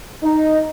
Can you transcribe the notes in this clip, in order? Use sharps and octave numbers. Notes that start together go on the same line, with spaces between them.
D#4